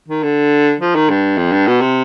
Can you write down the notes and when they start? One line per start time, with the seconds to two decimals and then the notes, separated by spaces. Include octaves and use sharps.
0.08 D#3
0.23 D3
0.80 F3
0.95 D#3
1.10 G2
1.37 F2
1.52 G2
1.67 B2
1.81 C3